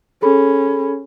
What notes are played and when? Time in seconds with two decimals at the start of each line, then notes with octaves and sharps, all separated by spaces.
0.22 C#4 G#4 A4 B5